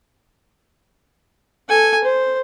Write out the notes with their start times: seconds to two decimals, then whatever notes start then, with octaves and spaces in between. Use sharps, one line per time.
1.69 A4 G#5
2.04 C5